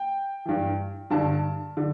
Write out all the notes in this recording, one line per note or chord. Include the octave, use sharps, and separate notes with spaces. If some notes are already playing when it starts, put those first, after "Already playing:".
Already playing: G5
G2 E3
G2 D3 A5
D3